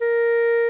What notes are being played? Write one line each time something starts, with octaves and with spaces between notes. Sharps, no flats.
A#4